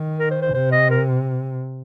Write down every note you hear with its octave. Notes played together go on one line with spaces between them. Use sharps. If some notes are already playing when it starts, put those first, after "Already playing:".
Already playing: D#3
A#4
C5
C5
C3 C5
D#5
A#4